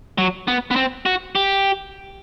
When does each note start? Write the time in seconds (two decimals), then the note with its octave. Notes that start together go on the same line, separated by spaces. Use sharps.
0.18 F#3
0.48 B3
0.71 B3
0.76 C4
1.06 F#4
1.35 G4